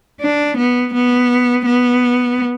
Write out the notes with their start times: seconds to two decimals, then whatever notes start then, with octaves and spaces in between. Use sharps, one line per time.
0.21 D4
0.57 B3
0.94 B3
1.66 B3